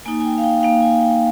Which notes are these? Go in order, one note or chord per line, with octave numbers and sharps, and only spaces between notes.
A#3 D#4 G#5
G#5
G5
F5
G5
A#3 D#4 F5
G#5
G5